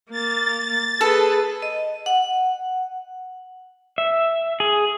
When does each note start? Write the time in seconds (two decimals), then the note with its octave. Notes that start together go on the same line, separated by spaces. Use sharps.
0.11 A#3 A6
1.01 G#4 A4 B4
1.62 D#5
2.06 F#5
3.98 E5
4.60 G#4